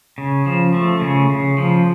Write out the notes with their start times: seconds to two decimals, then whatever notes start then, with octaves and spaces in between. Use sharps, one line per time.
0.18 C#3
0.46 F3
0.74 A3
1.01 C#3
1.30 C#3
1.58 F3